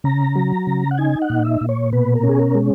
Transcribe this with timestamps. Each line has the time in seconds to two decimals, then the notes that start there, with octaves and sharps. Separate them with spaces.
0.04 C#3 A#5
0.36 F#3
0.67 C#3
0.91 F#5
0.98 D#4 G#5
1.22 F#5
1.30 A#2
1.45 E5
1.61 A#2
1.69 C#5
1.93 B2 B4
2.15 A#4
2.23 C#4
2.29 G#4
2.39 A#4
2.55 G#3